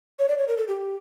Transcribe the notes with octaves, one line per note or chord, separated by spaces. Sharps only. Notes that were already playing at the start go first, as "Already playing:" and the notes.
C#5
D5
C#5
A#4
A4
G4